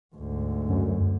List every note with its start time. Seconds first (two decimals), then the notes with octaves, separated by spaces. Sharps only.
0.15 D2 G#2
0.69 F#2